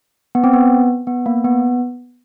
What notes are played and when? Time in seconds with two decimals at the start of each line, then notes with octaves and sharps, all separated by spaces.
0.35 B3
0.44 C4
0.53 B3
1.07 B3
1.26 A#3
1.45 B3